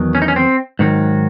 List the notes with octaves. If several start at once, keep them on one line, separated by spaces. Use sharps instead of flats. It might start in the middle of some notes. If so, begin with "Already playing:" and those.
Already playing: E2 D#3 F#3
C#4
D#4
C#4
C4
G#2 D#3 F#3